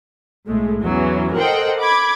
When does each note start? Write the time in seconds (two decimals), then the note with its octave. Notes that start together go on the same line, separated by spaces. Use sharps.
0.47 B1 A2 G#3 A3
0.84 E2 E3 F#3 C#4
1.35 A4 A#4 C5 D#5 F#5 G5
1.80 B5 D6 G#6